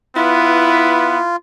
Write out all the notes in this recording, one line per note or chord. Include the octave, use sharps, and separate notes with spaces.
B3 E4 F4 B4